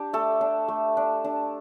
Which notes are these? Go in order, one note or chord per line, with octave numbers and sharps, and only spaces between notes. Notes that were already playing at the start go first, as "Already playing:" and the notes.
Already playing: D4 G4
A3 A4
D4
A3
D4
D4